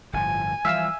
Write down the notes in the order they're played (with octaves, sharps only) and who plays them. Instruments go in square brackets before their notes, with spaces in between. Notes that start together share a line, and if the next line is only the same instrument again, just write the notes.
[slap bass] G1 A2 F3 [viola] G#5
[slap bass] E3 F3 G3 [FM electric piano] E5 F5 E6